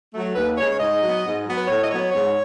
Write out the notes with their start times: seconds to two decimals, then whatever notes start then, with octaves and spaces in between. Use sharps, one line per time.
0.13 F#3 A3
0.35 D#2 B4
0.57 C#3 G#3 C#5
0.72 C#5
0.80 G#2 D#5
1.01 F#3 B3
1.24 G#2
1.46 F#3 B3
1.57 B4
1.67 A2 C#5
1.83 D#5
1.90 F#3 B3 C#5
2.12 G#2 C#5